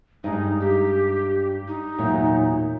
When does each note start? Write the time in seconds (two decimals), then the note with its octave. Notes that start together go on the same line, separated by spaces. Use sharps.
0.24 G2 G#3 D#4
0.60 G4
1.68 D#4
1.98 E2 A#2 F#3